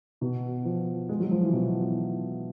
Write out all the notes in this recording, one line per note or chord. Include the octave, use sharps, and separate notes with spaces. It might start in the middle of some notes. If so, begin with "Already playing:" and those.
B2
F3
G#3
F#3
F3
E3
B2